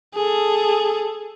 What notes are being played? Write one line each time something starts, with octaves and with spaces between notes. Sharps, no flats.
G#4 A4